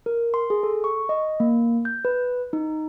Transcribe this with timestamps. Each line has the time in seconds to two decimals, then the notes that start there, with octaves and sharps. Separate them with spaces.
0.06 A#4
0.34 C6
0.50 G#4
0.63 A4
0.84 C#6
1.09 D#5
1.40 A#3
1.85 G6
2.05 B4
2.53 D#4